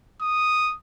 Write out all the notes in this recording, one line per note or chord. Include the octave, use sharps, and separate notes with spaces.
D#6